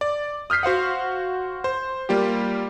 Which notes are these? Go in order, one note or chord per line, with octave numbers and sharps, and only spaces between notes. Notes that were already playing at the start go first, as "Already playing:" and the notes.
D5
D#6 F6 G6 B6 C7
F#4 C5 F5 F#5
C5
G3 A#3 F4 G4